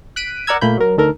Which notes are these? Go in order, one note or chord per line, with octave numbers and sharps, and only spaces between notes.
F#6 B6 D7 D#7
A#4 D5 F#5 A#5 E6 G#6
A#2 A3 A#3 B5 G6
F#3 A#4
D2 D#3 A4 A#4